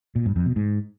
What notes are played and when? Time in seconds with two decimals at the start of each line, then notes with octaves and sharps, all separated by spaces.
0.16 A#2
0.26 G2
0.36 F2
0.46 B2
0.56 G#2